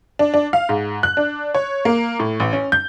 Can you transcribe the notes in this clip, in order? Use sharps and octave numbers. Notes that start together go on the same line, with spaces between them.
D4
D4
F5
G#2
F#6
D4
C#5
A#3
A2
A1
C#4
G6